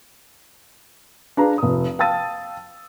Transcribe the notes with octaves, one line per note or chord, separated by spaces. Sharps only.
D4 G#4 B4 F5 A#5
F1 D#6
F5 G5 A5 E6 A6 D#7